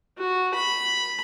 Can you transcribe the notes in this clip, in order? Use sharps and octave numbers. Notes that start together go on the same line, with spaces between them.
F#4
B5